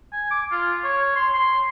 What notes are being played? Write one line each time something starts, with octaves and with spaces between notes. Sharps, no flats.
G#5
D6
F4
C#5
C6
C6